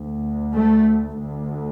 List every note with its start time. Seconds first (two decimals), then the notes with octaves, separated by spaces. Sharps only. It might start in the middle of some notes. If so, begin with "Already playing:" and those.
Already playing: D2
0.53 A3
1.17 D2